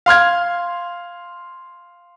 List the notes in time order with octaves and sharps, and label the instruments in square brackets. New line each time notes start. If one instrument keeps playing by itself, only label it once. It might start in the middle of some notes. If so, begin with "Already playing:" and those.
[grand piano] F5 C6 F6 G#6